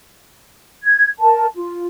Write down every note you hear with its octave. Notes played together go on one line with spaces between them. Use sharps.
G#6
A#4 A5
F4